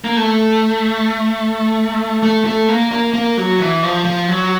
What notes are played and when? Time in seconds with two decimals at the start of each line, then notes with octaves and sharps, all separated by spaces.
0.04 A#3
0.17 A3
2.23 A3
2.45 A3
2.69 A#3
2.92 A#3
3.14 A#3
3.37 F#3
3.60 E3
3.83 F3
4.05 F3
4.28 F#3